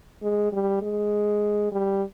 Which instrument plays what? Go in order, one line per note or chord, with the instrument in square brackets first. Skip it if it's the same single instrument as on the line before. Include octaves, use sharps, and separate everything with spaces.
[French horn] G#3
G3
G#3
G3